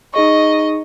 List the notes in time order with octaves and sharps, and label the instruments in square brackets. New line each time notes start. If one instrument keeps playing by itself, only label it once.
[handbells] D#4 G#4 C#6 [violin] D#5